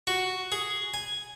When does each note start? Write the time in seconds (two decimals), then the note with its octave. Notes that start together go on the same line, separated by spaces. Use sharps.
0.07 F#4
0.52 G#4
0.94 G#5